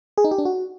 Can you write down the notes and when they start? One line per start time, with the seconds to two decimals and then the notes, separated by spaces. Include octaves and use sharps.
0.18 G#4
0.24 D#4
0.31 G4
0.38 D4
0.45 F#4